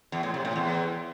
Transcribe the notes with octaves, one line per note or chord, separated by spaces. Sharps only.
E2
A2
C3
A2
E2